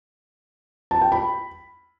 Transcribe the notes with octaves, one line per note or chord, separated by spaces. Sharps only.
A5
G5
B5